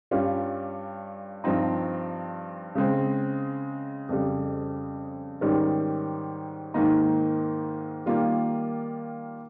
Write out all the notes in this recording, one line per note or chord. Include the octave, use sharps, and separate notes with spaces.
G2 G3 C#4 F4
G2 F3 C4 D#4
C#3 G#3 C4
F2 C#3 G3
G#2 D#3 G3 C#4
G#2 D#3 A#3 D#4
D#3 G3 A#3 F4